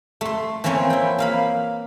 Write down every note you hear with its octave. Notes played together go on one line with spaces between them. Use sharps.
A3 C6
E3 F3 A#3 C4 C#5 G#5
E4 G5
A#3 F5 B5